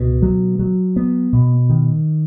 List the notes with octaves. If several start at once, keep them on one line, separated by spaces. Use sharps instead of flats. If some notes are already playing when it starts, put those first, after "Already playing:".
Already playing: C#2 B2
F#3
F#3
B3
B2
D#3